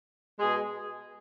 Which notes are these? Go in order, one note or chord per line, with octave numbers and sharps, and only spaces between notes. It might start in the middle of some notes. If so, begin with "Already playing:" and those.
B2 G#3 G#4